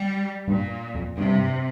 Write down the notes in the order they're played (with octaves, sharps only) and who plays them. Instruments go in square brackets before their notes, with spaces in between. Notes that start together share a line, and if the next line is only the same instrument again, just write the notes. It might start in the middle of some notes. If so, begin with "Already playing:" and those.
Already playing: [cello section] G3
[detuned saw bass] G2 [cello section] A#2
[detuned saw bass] F2
[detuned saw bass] G2 [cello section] C3